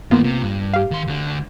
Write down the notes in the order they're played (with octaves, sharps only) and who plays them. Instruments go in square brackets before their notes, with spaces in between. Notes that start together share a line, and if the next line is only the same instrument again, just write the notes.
[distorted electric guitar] G2 D#3 [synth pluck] A#3 B3 F4
[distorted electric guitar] C3
G2
[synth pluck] G4 F5
[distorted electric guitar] D#3 C6
D2 D3